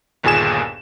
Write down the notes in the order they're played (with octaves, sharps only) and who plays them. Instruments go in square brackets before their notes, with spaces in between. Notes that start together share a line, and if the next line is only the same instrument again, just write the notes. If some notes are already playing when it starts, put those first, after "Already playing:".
[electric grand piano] G1 D#2 A#2 G#4 G#5 E7